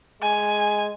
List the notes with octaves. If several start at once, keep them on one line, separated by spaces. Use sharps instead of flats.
G#3 G#5